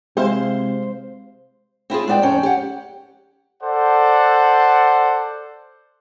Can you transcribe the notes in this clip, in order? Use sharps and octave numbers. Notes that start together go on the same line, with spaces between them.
C3 G#3 C4 E4 G4 C5 F5
C4 E4 F4 G#4
G#3 B3 D5 G5
F2 C#4 G5
G4 F#5
A4 C5 D5 F#5